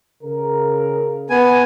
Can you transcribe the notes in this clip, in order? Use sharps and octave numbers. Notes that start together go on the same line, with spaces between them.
C#3 A#4
B3 G#5